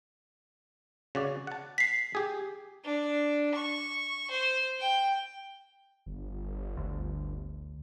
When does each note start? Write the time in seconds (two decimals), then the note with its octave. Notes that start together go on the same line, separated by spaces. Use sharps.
1.15 C#3 F#4 D5
1.47 F#5 A5
1.78 B6 C7
2.15 G4 G#4
2.84 D4
3.55 C#6
4.30 C5
4.80 G5
6.06 G1
6.77 D2